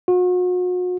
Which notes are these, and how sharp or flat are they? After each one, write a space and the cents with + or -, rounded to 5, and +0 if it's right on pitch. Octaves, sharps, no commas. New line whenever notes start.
F#4 -40